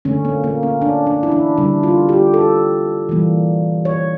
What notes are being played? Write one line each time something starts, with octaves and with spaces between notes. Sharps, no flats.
D3 A3 C#4
A#3
A#3
C#4
D4
D4
E4
D4
D3 G3 A#3 D4
F4
G4
A4
E3 G3 A#3
C#5